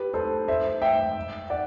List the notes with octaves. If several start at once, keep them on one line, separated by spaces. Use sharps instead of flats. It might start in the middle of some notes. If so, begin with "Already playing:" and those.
Already playing: G4 B4
A4 C5
C5 E5
E5 G5
D5 F#5